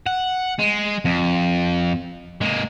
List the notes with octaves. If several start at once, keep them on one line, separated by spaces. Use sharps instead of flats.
F#5
G#3
F2
G#3 A#3